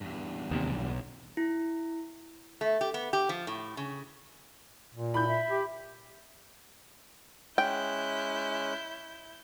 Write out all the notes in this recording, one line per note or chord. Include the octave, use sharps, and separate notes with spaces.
E2 G2
D#2 C3
B1
E4
A3
G4
B3
G4
F3
A2
C#3
A#2
E4 B5 G6
E5
G4
G#3 C#4 E4 G5 F#6 G6